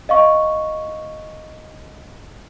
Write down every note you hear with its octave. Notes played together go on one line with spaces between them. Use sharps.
D#5 F5 C#6